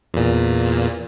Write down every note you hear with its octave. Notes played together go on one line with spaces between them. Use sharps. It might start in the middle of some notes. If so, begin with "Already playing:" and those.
E2 A#2